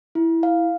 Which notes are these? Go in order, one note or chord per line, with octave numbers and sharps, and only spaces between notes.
E4
F5